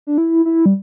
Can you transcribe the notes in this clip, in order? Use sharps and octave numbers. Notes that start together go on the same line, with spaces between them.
D4
E4
E4
G3